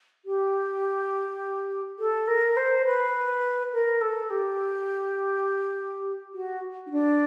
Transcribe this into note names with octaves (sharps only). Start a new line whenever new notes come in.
G4
A4
A#4
C5
B4
A#4
A4
G4
F#4
D#4
D4